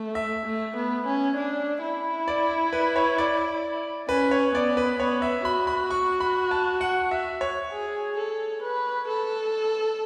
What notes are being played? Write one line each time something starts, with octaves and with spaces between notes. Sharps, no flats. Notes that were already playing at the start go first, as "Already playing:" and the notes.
Already playing: A3
E5
A3
B3
C#4
D4
E4
D5
B4
C#5
D5
C#4 B4
C#5
B3 D5
B4
B3 C#5
E5
F#4 B5
B5
C#6
B5
A5
F#5
E5
C#5
G#4
A4
B4
A4